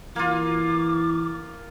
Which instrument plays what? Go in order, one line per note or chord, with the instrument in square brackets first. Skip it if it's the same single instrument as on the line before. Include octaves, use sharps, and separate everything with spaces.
[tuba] E3 [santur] A#3 F4 [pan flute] D6